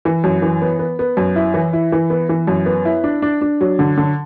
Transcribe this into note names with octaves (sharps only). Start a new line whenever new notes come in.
E3
F#2
E3
B3
B3
B3
F#2
E4
E3
E4
E3
B3
E3
F#2
B3
E4
D4
D4
D4
F#3
D3
D3